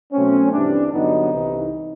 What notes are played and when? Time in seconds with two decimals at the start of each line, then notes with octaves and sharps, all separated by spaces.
0.13 B2 F#3 A3 C4 C#4
0.52 G2 E3 G3 C4 D4
0.92 G2 D3 F#3 B3 D#4
1.32 C2 C3 E3